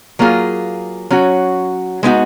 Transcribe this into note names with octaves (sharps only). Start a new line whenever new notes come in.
F#3 A#3 F4 G#4
F#3 C#4 F#4
G#3 B3 D#4 F#4